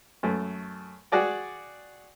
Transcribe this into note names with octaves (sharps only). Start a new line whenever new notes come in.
F#2 A3
F#4 G#4 D5 G5